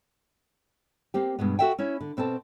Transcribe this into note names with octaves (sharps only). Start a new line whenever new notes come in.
A#3 C4 G4
G2 B2 G#3 B3
F#4 G#4 A4 E5 F#5 G5
C#4 E4 C#5
D3
B2 C4 A4 A5